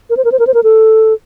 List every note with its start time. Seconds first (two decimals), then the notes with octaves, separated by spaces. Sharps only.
0.10 A#4
0.17 C5
0.25 A#4
0.32 C5
0.39 A#4
0.47 C5
0.54 A#4
0.63 A4